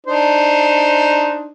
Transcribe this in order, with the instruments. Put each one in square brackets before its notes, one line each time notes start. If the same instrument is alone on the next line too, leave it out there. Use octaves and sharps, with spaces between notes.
[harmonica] D4 D#4 C5